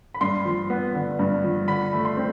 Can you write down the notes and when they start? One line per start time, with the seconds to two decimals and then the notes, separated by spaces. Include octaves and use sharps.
0.14 B5
0.21 G2 C6
0.45 F3
0.70 B3
0.95 D3
1.19 G2
1.44 F3
1.68 D3 B5
1.93 A3
2.05 C6
2.17 C4